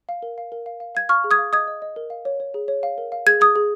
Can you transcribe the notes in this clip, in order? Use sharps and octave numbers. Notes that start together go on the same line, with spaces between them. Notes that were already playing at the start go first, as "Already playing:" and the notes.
F5
A#4
F5
A#4
F5
F5
F5 G#6
F5 C#6 F6
G#4
D#6 G#6
F5
D#5 D#6 G#6
D#5
D#5
A#4
F5
C#5
C#5
G#4
C#5
F5
A#4
F5
G#4 G#6
G#4 D#6 G#6
G#4